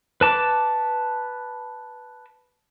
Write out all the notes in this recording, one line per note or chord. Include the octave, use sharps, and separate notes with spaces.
B4 A5 D6